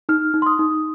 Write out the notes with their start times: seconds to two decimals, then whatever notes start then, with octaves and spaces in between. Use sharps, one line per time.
0.09 D#4 F6
0.34 D#4
0.42 C6
0.46 D#6
0.59 D#4